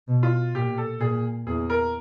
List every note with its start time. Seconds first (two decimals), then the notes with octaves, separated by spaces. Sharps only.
0.08 B2
0.23 F4
0.55 A#2 G4
0.78 A4
1.00 A#2 G#4
1.47 E2 G#4
1.70 A#4